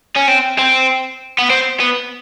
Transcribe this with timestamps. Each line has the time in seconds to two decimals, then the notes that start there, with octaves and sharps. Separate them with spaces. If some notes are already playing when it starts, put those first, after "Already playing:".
0.16 C#4
0.28 C4
0.58 C4
1.39 B3
1.50 C4
1.80 B3